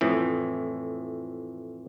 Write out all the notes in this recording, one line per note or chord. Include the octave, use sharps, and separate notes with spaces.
F2 A2 E3